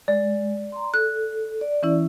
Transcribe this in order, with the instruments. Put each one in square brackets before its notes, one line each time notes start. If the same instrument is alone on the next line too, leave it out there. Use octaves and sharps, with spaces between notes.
[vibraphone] G#3 [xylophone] D5
[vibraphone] A#5 C6
[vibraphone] A4 [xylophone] F#6
[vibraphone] D5
[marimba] E3 C#4 E4